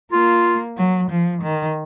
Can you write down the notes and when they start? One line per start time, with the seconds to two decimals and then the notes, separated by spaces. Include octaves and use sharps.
0.12 A#3 F4
0.77 F#3
1.10 F3
1.42 D#3